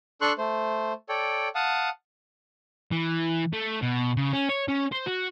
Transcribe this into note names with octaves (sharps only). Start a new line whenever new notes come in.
D4 A4 C6 C#6 F#6
A3 C5
A4 C#5 D5 G5
F5 F#5 A5 D#6
E3
A3
B2
C#3
C#4
C#5
C#4
C5
F#4